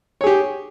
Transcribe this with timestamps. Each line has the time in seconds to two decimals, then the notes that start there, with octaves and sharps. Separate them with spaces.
0.21 C#5
0.24 G#4
0.27 G4